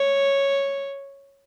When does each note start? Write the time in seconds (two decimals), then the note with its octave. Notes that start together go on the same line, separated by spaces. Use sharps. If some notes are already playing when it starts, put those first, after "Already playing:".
Already playing: C#5